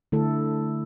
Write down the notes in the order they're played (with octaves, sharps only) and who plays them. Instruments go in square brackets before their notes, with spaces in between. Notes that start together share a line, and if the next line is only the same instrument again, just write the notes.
[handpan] D3 A3 E4 A4